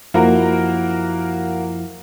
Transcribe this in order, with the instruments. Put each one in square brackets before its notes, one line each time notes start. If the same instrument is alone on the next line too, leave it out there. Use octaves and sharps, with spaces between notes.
[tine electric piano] F#2 F3 E4 [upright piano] A#3 F#4 A#4